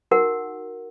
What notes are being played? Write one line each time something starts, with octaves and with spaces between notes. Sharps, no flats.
D#4 F#4 A#4 F#5